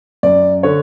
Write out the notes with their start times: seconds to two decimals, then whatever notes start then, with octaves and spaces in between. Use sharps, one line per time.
0.23 F#2 D5
0.63 D3 C#5